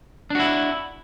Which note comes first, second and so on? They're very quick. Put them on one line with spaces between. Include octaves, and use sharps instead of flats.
D4 F#4 E4